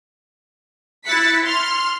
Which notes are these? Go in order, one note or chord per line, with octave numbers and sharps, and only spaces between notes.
E4 F#6 A6 B6 C#7
C6 F6